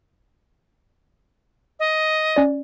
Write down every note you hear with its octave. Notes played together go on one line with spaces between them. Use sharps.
D#5
C#4 D5